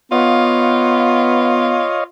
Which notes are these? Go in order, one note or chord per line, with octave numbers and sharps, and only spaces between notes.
B3 F4 C#5 D#5 F5